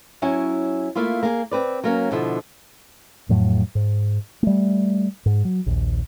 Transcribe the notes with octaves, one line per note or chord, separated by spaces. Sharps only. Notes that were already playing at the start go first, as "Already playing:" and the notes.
F#3 C#4 E4 G#5
A3 A#3 E4 F4
A#3 G#4
C4 B4 D5
F#3 A#3 C#4
B2 D3 F3 E4
F2 A2 F#3
G#2
G3 A3
G#2
F#3
A#1 D#2